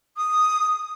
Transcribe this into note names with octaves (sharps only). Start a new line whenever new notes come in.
D#6